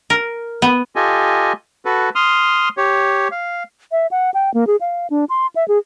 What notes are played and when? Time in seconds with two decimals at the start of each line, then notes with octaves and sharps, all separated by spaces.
0.10 A#4
0.62 B3
0.96 F4 G4 A4 D#5 G#5
1.85 F#4 A4 B4
2.15 C6 D#6 F6
2.77 G4 C#5
3.31 F5
3.92 E5
4.11 F#5
4.34 G5
4.54 A#3
4.67 G#4
4.81 F5
5.10 D4
5.29 C6
5.56 E5
5.68 G#4